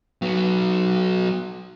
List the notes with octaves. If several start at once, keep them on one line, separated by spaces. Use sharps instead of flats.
F#3 B3